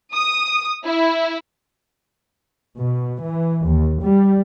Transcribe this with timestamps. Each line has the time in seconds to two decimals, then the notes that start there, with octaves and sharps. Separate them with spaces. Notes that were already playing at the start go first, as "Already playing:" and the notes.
0.13 D#6
0.84 E4
2.80 B2
3.23 E3
3.67 D#2
4.03 G3